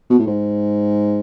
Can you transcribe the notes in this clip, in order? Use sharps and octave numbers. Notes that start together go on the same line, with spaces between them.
B2
A2
G#2